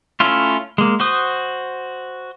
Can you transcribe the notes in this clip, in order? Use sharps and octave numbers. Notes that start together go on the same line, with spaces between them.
A3 C#4 E4 F4
G#3 A#3
F#4 C5 D#6